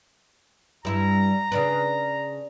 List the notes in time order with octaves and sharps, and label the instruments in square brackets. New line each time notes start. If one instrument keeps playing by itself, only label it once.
[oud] G2 E4 [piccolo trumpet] A#5
[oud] C#3 D4 B4